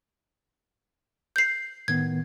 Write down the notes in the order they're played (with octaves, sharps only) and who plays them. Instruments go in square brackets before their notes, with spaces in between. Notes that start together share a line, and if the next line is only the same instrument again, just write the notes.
[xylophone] G6 C7
[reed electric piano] A2 D#3 B3 [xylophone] G#6